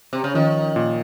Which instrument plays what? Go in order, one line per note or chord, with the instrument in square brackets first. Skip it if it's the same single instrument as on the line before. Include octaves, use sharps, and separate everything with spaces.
[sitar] C3
C#3
[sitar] D#3 [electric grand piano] F3
[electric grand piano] A#2